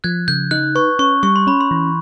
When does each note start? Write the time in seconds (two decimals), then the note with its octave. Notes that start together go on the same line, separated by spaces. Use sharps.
0.04 F3 F#6 G#6
0.28 C#3 G6
0.51 D#4 F#6
0.75 B4 C#6
0.99 C#4 C#6
1.23 G3 C#6
1.36 C6
1.47 C#4 B5
1.61 C6
1.71 E3